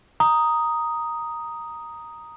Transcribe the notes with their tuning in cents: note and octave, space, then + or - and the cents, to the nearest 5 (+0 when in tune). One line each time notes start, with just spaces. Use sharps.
A#5 +0 D#6 +0